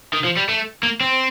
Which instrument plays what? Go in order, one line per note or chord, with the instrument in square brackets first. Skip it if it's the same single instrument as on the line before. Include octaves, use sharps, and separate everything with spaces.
[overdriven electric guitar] D#3
F3
G3
A3
A#3
C4